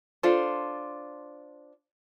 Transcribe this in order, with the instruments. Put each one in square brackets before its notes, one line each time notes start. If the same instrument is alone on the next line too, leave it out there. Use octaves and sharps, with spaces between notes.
[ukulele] D4 F4 A4 C5